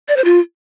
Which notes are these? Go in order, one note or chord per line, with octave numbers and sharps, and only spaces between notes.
D5
C5
F4